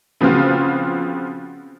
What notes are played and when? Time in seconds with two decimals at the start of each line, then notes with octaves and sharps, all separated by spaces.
0.21 C#3 F3 B3 C4 F4 F#4